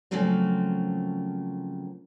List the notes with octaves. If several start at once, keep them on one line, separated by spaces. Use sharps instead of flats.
C#3 F3 F#3 A3 A#3 C4